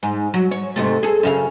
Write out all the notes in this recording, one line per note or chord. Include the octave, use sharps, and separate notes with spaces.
G#2
F#3
C#5
G#2 C3 A3
G#4 A4
F#2 C#3 F5